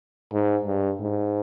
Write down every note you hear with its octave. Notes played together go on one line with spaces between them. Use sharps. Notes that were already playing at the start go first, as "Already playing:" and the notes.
G#2
G2
G#2